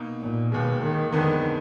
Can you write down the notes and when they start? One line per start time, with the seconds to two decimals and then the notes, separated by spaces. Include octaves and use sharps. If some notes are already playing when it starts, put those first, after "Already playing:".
Already playing: B2 A#3 D#4
0.21 A#2
0.52 D#2 B2 D#3 G#3
0.82 D#3
1.12 F2 D3 D#3 G#3 B3 D#4